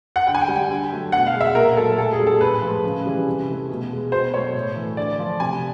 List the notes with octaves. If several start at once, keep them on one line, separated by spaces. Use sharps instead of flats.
F#5
D3 G5
G#5
G5
G3
G5
D3
F#3 A3
B2 F#5
F5
G#3
E5
A#2 A#4
F#3 A3 A4
A#2 A4
G#4
G3
A4
A2 B4
F3 G#3
C#3
E3 G3
C3
E3 A3
B2
G#3
B2 C5
F#3 A3 C#5
A2
E3 A3
D3 D5
F3 A3
C3 G#5